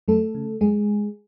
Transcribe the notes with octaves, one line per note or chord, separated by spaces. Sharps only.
F#2 A3 A4
C#3
F#2 G#3 G#4